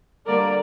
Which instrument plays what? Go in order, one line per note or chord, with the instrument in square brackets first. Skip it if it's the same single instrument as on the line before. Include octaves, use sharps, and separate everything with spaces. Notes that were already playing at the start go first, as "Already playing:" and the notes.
[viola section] D3 G3 A#3 A#4 D5